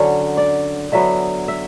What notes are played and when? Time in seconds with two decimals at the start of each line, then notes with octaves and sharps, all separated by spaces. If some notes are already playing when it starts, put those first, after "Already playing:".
Already playing: D3 F#3 C#4 C#5
0.37 D5
0.92 D3 F#3 B3 E5
1.48 E5